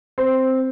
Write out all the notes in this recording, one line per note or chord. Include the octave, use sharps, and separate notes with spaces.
C4